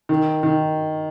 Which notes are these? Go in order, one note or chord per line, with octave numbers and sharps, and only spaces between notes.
D#3
D#3